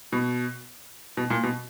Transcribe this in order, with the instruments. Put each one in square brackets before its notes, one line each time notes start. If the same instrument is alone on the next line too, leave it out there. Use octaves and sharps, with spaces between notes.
[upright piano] B2
B2
A#2
B2